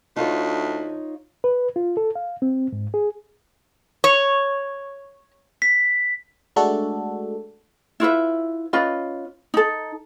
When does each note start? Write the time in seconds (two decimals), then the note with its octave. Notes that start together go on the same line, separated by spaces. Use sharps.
0.16 D2 D#4 F4 C#5
1.44 B4
1.76 F4
1.97 A4
2.15 F5
2.42 C4
2.72 G#2
2.94 G#4
4.04 C#5
5.62 B6
6.56 G#3 A3 D4 F#4 A4
8.00 E4 F4 B4 E5
8.73 C#4 F4 B4 D#5
9.54 D#4 A4